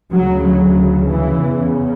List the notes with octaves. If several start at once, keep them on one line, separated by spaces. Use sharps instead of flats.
D2 C#3 F#3
F#3
E3
E2 C#3